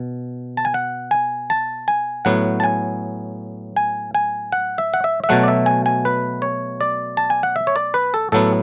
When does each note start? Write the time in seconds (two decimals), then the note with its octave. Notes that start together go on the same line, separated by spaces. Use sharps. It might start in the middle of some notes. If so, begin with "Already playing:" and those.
Already playing: B2
0.57 A5
0.65 G#5
0.74 F#5
1.11 G#5
1.50 A5
1.88 G#5
2.25 A2 F#3 B3 F#5
2.60 A5
2.64 G#5
3.77 G#5
4.15 G#5
4.52 F#5
4.78 E5
4.94 F#5
5.04 E5
5.24 E5
5.29 B2 F#3 A3 F#5
5.44 D5
5.48 E5
5.66 G#5
5.86 G#5
6.05 B4
6.42 C#5
6.81 D5
7.17 A5
7.30 G#5
7.43 F#5
7.56 E5
7.67 C#5
7.76 D5
7.94 B4
8.14 A4
8.32 A2 F#3 B3 A4